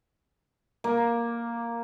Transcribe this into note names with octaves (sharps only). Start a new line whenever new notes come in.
A#3